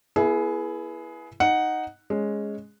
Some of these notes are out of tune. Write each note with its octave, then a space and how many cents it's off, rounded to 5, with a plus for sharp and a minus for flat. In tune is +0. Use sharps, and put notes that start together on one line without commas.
B3 -20 E4 +10 G#4 +20
D#4 +0 F#5 +0
G#3 +0 C#4 +0